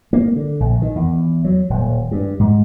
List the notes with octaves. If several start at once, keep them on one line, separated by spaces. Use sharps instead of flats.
A#3
D3
A#1
D#3
E2
F#3
D#1
G2
G#2